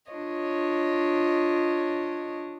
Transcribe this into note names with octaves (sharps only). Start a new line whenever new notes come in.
D4 F4 C#5 D#5